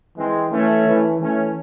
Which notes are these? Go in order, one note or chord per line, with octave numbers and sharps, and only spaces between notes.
E3 G#3 C4
E3 A3 C#4
E3
E3 A3 C#4